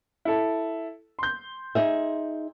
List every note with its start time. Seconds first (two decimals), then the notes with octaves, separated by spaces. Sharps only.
0.25 E4 A4
1.19 C6 G6
1.75 D#4 G#4 E5